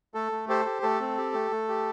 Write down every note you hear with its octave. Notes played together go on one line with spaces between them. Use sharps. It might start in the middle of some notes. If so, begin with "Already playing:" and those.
A3 A4
A3
G4 A4 C5
G4
A3 A4
C4
G4
A3
A3
G4